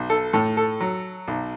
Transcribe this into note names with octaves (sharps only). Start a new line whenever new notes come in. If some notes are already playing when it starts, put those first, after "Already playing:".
Already playing: B1
A4
A2 A4
A4
F#3
B1